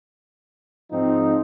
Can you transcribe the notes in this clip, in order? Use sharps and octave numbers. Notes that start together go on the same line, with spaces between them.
G#2 F3 G#3 C4 D#4